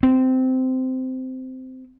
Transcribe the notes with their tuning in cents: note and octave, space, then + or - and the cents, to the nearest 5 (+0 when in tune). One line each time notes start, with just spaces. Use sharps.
C4 -15